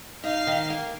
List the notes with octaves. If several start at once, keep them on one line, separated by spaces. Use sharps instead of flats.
D#4 F5
D#3
A#3